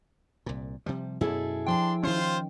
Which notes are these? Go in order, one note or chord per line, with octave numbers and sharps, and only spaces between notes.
C2 A#2
C3 F3 G3
F#2 B2 E4 G#4 A4
F3 D4 G5 C6
D#3 C#4 F4 C5